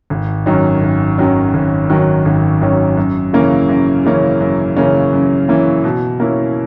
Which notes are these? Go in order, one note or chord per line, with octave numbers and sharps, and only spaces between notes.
G#1
F#2 D#3 F#3 C#4
G#1
F#2 D#3 F#3 C#4
G#1
F#2 D#3 F#3 C#4
G#1
F#2 D#3 F#3 C#4
F#2
C#3 E3 A#3 C#4
F#2
C#3 E3 A#3 C#4
F#2
C#3 E3 A#3 C#4
F#2
C#3 E3 A#3 C#4
B2
A#3 C#4 E4